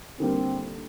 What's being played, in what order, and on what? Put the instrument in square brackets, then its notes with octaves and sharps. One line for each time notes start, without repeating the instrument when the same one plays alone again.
[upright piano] D3 G3 A#3 [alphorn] C4